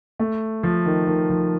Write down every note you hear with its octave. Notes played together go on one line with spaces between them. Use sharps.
A3
F3
D#3
D#3
F3